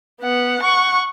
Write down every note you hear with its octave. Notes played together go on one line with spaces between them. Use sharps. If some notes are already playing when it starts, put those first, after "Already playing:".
B3 F#5
F#5 C#6